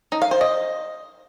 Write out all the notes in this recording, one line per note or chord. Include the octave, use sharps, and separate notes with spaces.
D#4
F5
C5
D#5